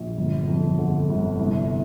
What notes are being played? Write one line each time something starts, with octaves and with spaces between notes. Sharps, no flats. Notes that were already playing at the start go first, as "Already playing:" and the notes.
Already playing: A#1
G1
F2
D3
G1
C2